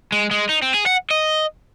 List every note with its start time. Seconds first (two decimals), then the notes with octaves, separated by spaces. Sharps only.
0.12 G#3
0.31 G#3
0.49 D#4
0.62 C4
0.74 G#4
0.86 F#5
1.11 D#5